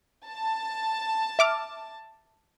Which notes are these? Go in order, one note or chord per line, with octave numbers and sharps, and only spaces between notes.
A5
E5 D6 F6